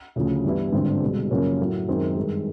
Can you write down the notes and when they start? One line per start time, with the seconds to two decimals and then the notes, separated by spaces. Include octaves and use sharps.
0.16 D2 C#3 F3 A3
0.44 G2 E3 G3 B3 E4
0.73 G#1 G2 D3 G3 C4
1.02 C2 B2 G#3
1.31 F#2 C#3 F3 A#3 C#4
1.59 A2 F#3 A3
1.88 F#2 D#3 G#3 C4 D#4
2.17 G2 D#3 G#3